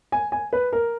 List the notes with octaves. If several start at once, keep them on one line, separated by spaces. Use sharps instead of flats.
G#5
G#5
B4
A#4